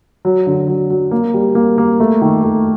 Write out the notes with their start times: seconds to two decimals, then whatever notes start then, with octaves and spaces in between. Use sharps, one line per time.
0.25 F#3
0.47 D3
0.68 F#3
0.90 F#3
1.11 A#3
1.34 G3
1.55 A#3
1.78 A#3
2.00 A3
2.21 D#3
2.43 A3